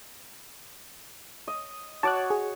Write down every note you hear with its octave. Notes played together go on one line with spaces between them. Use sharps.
D#5
F#4 C#5 A5 D6 F#6
G#4